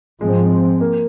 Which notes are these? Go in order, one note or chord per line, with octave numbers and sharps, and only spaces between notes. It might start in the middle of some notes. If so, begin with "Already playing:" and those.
G#2 F3 G#3 C4
A#3